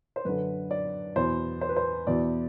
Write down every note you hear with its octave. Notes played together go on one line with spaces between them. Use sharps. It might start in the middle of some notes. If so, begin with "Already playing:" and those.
C5
F#2 D3 B4
D5
E2 B2 C5
C5
B4
C5
E2 B2 D5